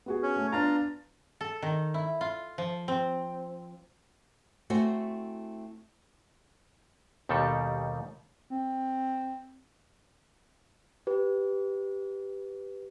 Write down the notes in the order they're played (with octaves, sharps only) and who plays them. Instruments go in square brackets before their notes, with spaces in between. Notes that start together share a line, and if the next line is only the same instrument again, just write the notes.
[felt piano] B3 F#4 G#4
[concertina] C#4
[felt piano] A3
[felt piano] B3 D4 A6 [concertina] F4 A#5
[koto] A4
D#3
E4
F4
F3
C4
[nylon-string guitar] A3 C4 E4 F#4 C5 G#5
[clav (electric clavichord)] D#2 B2 D#3 G3 A4
[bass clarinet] C4
[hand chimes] G4 B4